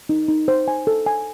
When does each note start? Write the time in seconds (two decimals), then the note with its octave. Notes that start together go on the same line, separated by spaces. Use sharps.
0.09 D#4
0.28 D#4
0.48 C5
0.68 G#5
0.87 A4
1.06 G#5